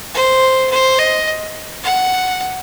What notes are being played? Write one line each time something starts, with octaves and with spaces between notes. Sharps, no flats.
C5
C5
D#5
F#5